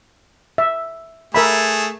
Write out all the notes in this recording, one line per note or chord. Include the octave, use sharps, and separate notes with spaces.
E5
A3 G#4 A#4 E5 B5